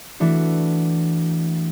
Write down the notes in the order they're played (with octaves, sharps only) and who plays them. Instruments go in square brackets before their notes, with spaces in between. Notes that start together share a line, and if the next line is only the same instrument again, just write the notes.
[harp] E3 A3 D4 F#4